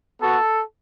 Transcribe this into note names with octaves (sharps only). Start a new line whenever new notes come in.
B3 F#4 A4